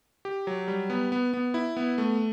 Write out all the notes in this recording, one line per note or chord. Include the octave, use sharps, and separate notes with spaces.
G4
F#3
G3
B3
B3
B3
E4
B3
A3